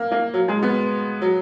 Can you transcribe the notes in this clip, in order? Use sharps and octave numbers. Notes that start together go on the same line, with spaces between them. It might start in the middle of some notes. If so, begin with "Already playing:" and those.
Already playing: A#3
A#3
F#3
G#3
B3
F#3